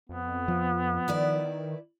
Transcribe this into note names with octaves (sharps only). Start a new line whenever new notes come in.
F2 B3
F3
D#3 E4 B4 D5